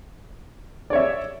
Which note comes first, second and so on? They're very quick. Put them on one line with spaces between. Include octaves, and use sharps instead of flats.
D5 C#5 E5